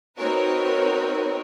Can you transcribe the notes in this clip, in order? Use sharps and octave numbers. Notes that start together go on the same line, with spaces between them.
C4 D#4 F#4 A#4 B4 C#5